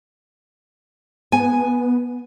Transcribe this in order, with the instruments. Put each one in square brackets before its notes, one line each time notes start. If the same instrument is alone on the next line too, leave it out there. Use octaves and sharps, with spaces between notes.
[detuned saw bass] B3 [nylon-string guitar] G#5